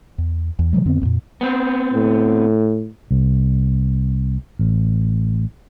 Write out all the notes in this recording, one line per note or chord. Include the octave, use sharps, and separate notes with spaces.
E2
E2
C3 E3 F#3 G#3
F2 D3 B3 C4
A1 F2 A#2
B3 C4
A2
C2
A1